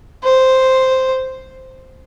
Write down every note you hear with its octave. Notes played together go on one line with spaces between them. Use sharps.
C5